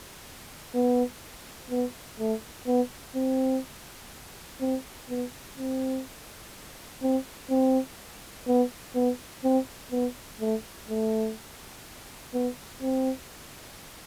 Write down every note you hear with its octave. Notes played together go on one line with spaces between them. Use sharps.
B3
B3
A3
B3
C4
C4
B3
C4
C4
C4
B3
B3
C4
B3
A3
A3
B3
C4